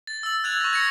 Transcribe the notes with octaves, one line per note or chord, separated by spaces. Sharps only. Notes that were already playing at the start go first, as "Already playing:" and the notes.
A6
E6 F#7
F#6 G#6 F7
C#6 A#6
G#6 A#6 C#7